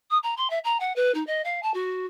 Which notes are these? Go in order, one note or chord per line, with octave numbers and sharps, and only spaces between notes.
D#6
A#5
C6
E5
A#5
F#5
B4
D#4
D#5
F5
A5
F#4